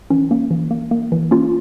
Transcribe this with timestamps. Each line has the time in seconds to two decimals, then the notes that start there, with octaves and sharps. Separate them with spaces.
0.10 E3 C#4
0.31 A#3 C#4
0.51 E3
0.71 A#3
0.91 A#3
1.12 E3
1.31 A#3 C#4 F4